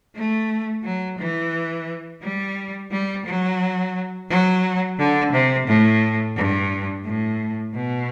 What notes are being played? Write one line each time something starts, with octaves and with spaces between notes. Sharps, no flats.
A3
F#3
E3
G3
G3
F#3
F#3
D3
C3
A2
G2
A2
B2